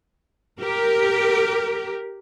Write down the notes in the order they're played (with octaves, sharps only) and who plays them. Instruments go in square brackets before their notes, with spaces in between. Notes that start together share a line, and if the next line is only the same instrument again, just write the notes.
[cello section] G4 A#4